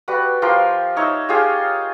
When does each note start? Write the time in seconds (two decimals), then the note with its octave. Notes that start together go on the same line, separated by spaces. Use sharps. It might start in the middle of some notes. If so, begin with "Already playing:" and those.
0.08 G3 F#4 B4
0.42 F3 G4 A#4 C6
0.96 D#4 C#5 E5
1.29 F4 G4 G#4 C#5